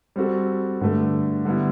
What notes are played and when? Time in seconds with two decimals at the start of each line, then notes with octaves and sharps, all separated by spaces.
0.16 G3 C4 F#4 A4
0.81 G2 D3 A3
1.45 D3 G3 B3 E4